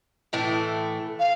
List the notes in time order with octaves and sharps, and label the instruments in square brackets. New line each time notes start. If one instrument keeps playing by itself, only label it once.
[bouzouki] A2 E3 A3
[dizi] F5